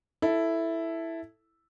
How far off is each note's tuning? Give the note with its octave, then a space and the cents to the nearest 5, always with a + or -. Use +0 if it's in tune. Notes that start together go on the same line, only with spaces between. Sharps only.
E4 +0 A4 +0